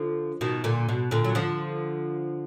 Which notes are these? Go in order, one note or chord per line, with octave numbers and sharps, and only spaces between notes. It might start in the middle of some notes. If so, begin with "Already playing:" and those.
Already playing: D3 F3
B2 D#3
A#2 D3
B2
A#2 D3
F#3
D3 F3